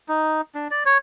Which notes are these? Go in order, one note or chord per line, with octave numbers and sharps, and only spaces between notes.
D#4
D4
D5
C#5